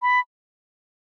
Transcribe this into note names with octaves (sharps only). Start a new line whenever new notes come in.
B5